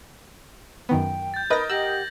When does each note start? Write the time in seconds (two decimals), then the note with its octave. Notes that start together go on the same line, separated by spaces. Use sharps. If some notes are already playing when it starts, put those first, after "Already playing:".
0.89 F#2 D#3 B3 G5
1.34 G6 A6
1.50 A#4 B4 D#5 B5 D#6 A#6
1.70 G4 F#5 E6 G6 A#6 F#7